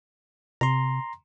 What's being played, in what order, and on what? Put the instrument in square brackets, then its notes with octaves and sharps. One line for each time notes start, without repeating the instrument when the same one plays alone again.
[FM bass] C3 [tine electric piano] A#5 C6